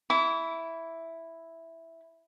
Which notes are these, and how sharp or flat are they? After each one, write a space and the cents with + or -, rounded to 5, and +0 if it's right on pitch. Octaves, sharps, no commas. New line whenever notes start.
E4 +0 D6 -45